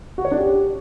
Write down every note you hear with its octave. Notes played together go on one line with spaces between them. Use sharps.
F#4
C#5
D4
G4